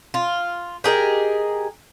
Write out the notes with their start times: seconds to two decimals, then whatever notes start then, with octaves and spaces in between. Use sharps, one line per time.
0.14 F4
0.84 G4 G#4 A#4 D#5